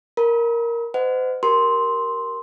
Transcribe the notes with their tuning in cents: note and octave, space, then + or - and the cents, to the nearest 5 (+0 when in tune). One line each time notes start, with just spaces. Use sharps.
A#4 +0 B5 -30
C5 -40 D#5 -20 F#5 +0
G4 -30 A#4 +0 C6 +0